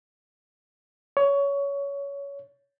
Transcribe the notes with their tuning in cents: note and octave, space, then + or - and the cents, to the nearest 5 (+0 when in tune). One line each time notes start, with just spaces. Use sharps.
C#5 +20